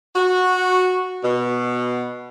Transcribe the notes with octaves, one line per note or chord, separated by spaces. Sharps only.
F#4
B2